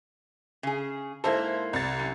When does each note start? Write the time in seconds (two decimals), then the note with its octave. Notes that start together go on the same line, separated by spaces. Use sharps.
0.63 C#3 G#4
1.24 G#2 A#3 E4 A4 C5
1.73 C2 A6
1.99 F#2